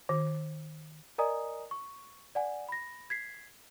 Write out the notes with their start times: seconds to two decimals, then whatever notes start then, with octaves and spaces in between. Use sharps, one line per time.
0.09 D#3
1.18 A#4 D5 D#5 G#5 A#5 D#6
1.71 C#6
2.35 D5 F#5 G#5
2.69 B5 A#6
3.10 G#6 B6 C7